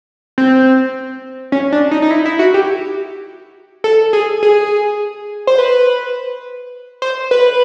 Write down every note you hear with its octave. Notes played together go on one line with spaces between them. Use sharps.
C4
C#4
D4
D#4
D#4
E4
E4
F#4
G4
A4
G#4
G#4
C5
B4
C5
B4